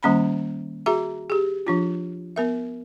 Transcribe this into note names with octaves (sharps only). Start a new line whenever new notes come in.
D#3 G3 A#3 C#4 A#5 B5
F#4 G#4 E5 A#5
G4 G#4
F3 D4 F4
B3 A#4 E5